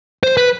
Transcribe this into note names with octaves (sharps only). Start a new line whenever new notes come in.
C5
B4